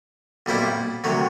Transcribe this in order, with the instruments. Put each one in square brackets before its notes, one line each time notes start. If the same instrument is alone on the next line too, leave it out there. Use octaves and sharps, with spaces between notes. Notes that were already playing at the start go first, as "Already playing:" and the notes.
[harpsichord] B1 A#2 G3 C4 E4
D2 C3 D#3 F#3